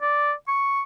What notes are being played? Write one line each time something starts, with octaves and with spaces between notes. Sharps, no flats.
D5
C#6